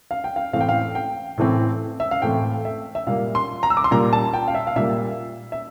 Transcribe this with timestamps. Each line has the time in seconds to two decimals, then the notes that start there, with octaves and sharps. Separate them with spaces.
0.11 F5
0.24 G5
0.36 F5
0.53 A2 E3 A3 C4 F5
0.61 G5
0.69 F5
0.95 G5
1.38 A2 E3 A3 C4
2.00 E5
2.11 F5
2.22 A2 E3 A3 C4 G5
2.65 E5
2.95 E5
3.07 A#2 G3 A#3 F5
3.35 C6
3.63 A#5
3.70 E6
3.77 D6
3.84 C6
3.91 A#2 G3 A#3 A#5
4.13 A5
4.34 G5
4.48 F5
4.55 E5
4.67 F5
4.76 A#2 G3 A#3 E5
5.52 E5